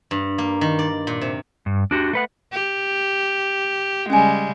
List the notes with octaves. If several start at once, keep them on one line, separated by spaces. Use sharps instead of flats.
G2
A#3
D#3
D5
A#2
C3
G2
D4 F#4 G4
A3 B4 F#5
G4
C#3 G3 G#3 C#4 G#5